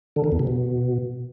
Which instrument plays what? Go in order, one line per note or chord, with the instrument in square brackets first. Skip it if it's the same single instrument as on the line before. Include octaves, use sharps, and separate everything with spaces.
[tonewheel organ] D3
D#3
E2
C3
B2